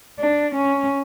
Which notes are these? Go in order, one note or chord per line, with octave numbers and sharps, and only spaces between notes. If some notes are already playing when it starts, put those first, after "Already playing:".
D4
C#4